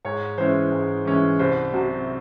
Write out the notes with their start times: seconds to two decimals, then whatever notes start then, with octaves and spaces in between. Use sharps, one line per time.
0.05 G#2 C#5
0.38 E3 G#3 C#4 E4 C5
0.72 G#2
1.05 E3 G#3 C#4 E4
1.39 C2 C5
1.73 C3 F#3 F#4